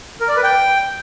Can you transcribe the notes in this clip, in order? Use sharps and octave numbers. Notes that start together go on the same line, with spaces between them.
A#4
D5
B4
G5